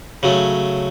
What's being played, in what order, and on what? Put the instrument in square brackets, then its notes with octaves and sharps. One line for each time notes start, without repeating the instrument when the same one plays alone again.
[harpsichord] C#3 F#3 A3